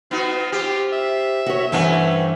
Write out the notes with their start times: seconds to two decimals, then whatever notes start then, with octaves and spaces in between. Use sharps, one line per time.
0.11 B3 D#4 F4 F#4
0.52 C4 F4 G4
0.93 E5
1.46 F#4 C#5
1.72 G2 E3 A3 C4 C#4 F#5